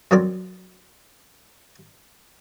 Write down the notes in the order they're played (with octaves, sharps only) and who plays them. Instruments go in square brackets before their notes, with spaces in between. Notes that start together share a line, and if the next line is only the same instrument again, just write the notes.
[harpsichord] F#2 F#3 C4 A#4 D5 D6